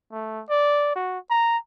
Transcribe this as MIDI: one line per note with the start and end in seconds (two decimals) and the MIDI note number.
0.12 0.42 57
0.49 0.94 74
0.96 1.19 66
1.30 1.57 82